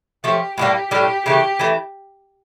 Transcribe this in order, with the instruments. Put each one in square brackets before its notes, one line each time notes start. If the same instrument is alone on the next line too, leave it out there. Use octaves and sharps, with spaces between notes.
[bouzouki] F3 A3 C#4 [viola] G4
[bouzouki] A2 E3 G3 A#3 [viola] G4
[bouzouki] A2 G3 D4 [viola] G4
[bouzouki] C#3 E3 A3 [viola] G4
[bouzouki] E3 A3